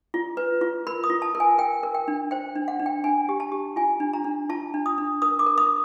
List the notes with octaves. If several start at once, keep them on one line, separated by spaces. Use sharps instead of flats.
F4
B4
F4
A#4 B5
D#6
F4
A5
A#4
G#5
A#4 G5
A#4
G5
D4
C5 G5
D4
F#5
D4
G5
D4 G#5
G4
A5
G4
F4 G#5
D4
A#5
D4
F4 A5
D4
D#6
D4
A#4 D#6
D6
A#4
D#6